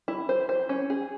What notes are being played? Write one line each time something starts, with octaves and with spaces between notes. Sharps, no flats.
E4
C5
C5
C#4
G#4